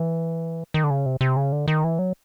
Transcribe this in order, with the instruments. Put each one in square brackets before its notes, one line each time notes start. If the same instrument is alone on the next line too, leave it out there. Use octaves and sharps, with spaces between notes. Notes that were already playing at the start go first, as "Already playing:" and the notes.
Already playing: [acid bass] E3
D#3
D3
C#3
C3
C3
C#3
D3
D#3
E3
F#3